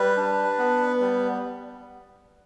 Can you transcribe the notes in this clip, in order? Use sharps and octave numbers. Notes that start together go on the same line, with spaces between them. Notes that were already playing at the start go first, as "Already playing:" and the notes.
Already playing: G3 B4
D4
B3
G3